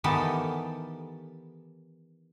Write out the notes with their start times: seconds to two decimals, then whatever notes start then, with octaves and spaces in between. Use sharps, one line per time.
0.04 D#3 E3 B3 G4 A4